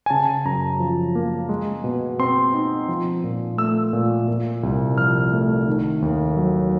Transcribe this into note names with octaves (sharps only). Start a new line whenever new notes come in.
G#5
C#3 A5
F#2 A#5
F3
A#3
G#3
B2
C4 C6
D#4
F3
A#2
A3 E6
A#2
A#2
C2
F3 F6
A3
D#3
D#2
F#3